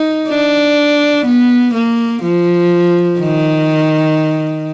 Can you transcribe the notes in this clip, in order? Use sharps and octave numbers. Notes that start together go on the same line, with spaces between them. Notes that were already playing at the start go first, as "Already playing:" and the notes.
Already playing: D#4
D4
B3
A#3
F3
D#3